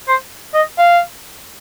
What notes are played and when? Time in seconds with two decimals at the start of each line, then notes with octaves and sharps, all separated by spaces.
0.08 C5
0.54 D#5
0.78 F5